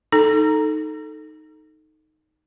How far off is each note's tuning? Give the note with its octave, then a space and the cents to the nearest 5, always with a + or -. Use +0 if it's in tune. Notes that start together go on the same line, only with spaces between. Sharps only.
D#4 +0 A4 +0